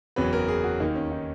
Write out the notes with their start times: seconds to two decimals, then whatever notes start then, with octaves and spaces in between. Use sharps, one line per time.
0.16 F#1 E2 C#3 F#3 B3 B4
0.33 A#4
0.48 G#4
0.64 F#4
0.80 D#2 D#3 A#3 D#4
0.95 C#4
1.12 D#4